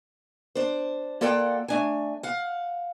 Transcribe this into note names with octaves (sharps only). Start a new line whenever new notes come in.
D4 C5
A#3 F4 A4 D5 F#5 G5
A3 D4 G#5
F5 F#5